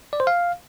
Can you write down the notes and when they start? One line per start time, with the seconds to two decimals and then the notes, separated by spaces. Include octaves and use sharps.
0.13 D5
0.20 C5
0.27 F5